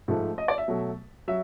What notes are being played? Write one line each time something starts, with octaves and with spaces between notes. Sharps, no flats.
G#2 F3 A3
D#5
D5
E5
B2 F#3 A3
F#3 E5